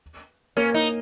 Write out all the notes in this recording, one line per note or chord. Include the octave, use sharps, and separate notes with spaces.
A#3 C#4
D#4